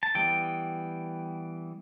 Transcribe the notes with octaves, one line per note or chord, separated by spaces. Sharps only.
A5
E3 G3 B3 G5